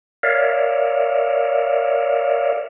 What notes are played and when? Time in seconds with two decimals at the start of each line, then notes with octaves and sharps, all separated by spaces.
0.23 A#4 C#5 D5 E5 F5